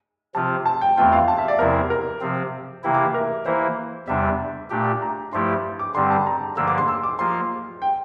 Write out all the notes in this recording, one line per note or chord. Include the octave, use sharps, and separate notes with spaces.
C3 F3 C4 F4 A5
A5
G5
E2 E3 A3 C4 F4 G5
F5
A5
E5
D5
E2 C3 F3 C4 E4 A#4
A#4
C3 F3 C4
C3 E3 A#3 E4 G5
D6
E5
A#4
E3 A#3 E4 C5
E2 C3 G3 D4 E5
A#2 A3 D4 G4
A#5
G2 F3 A3 E4 G4 C6
D6
G2 D3 G3 C4 C6
A5
A#5
G2 D3 F3 A#3 D4 E6
D6
C6
E6
D6
F3 A#3 F4 C6
G5